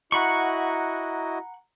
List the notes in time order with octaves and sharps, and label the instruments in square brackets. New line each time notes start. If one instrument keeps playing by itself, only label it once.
[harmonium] E4 F#4 D#5 [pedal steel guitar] F#5 B5 C#6 [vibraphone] A#5